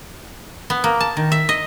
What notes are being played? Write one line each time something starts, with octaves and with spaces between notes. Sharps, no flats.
B3
A#3
A5
D#3
E5
D#5